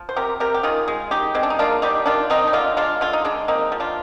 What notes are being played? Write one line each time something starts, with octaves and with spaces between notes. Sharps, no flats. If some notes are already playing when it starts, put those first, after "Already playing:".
Already playing: F3
C5
C3 G4 A#4
C3 G4 A#4
G4
D#3 F4 G#4
G#3
D#3 D#4 G4
G#3 C4
D4
D#4
A#3 D4 F4
G3 D#4 G4
D#3 D4 F4
D#3 C4 D#4
D#4
D3 D4 F4
G#3 D4 F4
D3 F4
D#4
G#3 D4
A#3 C4 D#4
F3
D4 F4